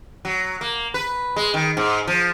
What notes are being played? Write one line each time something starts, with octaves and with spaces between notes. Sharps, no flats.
F#3
A#3
B4
G#3
D#3
G#2
F3